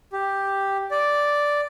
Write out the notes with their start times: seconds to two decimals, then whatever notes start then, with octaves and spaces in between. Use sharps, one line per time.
0.13 G4
0.91 D5